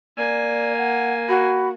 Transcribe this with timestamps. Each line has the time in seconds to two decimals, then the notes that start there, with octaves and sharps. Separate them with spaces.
0.17 A#3 D5 G#5
0.78 F#5
1.29 F#4 B5